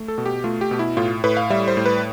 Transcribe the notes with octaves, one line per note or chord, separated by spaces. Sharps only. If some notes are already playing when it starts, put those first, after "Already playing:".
Already playing: A3
A4
B2
G4
A3 F4
G4
B2
E4
A2 F4
A2 B4
F5
G3 E5
C5
A2
B4